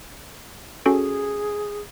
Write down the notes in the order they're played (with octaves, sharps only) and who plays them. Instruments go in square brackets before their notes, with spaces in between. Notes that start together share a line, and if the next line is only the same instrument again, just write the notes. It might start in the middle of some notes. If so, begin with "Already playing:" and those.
[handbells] C#4 F#4 A4 [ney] G#4